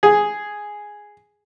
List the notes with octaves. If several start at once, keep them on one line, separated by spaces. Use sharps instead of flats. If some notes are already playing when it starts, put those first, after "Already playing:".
G#4